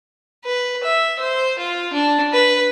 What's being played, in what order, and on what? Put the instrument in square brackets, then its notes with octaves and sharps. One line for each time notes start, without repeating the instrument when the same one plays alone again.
[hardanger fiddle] B4
E5
C5
F4
D4
B4